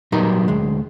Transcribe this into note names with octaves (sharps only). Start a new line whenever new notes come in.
A#2 F#3 G3 B3 D#4 A#4
D2 G#3